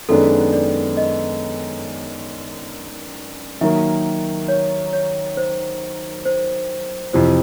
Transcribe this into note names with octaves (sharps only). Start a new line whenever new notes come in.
F#2 D#3 G#3 B3 D4 A4
D5
D#5
D#3 F#3 A#3 E5
C#5
C#5
C5
C5
F2 C3 E3 C5